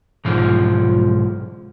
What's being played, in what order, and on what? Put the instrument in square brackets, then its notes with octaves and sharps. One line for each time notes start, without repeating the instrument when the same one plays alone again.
[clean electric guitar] B1 G#2 F3